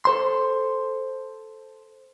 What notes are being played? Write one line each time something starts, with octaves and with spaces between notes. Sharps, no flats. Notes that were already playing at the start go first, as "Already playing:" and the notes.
A4 C5 C6